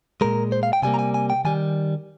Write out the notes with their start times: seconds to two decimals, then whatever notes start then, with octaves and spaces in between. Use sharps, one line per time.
0.21 A#2 G#3 A#4
0.52 C5
0.63 F5
0.73 G5
0.82 C3 G3 A#3 G#5
0.94 A#5
0.99 G#5
1.14 G#5
1.30 G5
1.45 D#3 G3 G#5